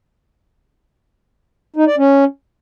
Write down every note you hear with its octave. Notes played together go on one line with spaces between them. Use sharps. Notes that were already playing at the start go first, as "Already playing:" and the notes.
D#4
D5
C#4